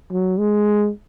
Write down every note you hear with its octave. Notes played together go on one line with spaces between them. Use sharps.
F#3
G#3